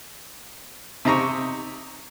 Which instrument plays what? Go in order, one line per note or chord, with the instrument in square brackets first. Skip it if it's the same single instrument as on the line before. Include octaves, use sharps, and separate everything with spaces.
[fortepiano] C3 D#4 A#5 C#6